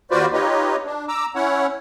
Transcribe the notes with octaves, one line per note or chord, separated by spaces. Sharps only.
D#2 F4 F#4 B4 C5 D5
D#4 F4 G4 B4 C#5 D#5
D4
A#5 D6 E6
C#4 E4 C#5 F#5